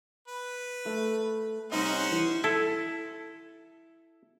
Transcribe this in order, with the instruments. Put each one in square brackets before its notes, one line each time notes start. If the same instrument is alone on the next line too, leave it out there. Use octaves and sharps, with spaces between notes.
[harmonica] B4
[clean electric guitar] A3
[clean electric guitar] C2 D#4 D#5 [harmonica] C#4 F#4 C5
[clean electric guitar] E3
[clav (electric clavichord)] E4 [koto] A4